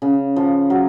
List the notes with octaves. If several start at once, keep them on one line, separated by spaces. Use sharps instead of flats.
C#3
F3
F#3